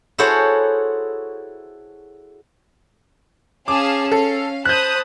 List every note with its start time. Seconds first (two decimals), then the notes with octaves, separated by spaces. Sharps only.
0.18 E4 F#4 G#4 A4 C5 C#5
3.68 C#4 G#4 F5 A5 D6
4.12 A4 F5
4.65 C5 A5 B5 D#6 F#6 G6